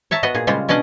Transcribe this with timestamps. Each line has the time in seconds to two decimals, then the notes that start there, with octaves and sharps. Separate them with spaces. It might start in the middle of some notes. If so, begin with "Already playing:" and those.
0.11 C#5 E5 A5 A#5
0.23 B3 F#4 D#5
0.34 A#2 G#4
0.47 C#3 G3 G#3 F4
0.69 B2 C#4 D4 D5 D#5